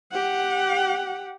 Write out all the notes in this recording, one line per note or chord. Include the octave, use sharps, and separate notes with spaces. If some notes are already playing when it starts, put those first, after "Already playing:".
G4 F#5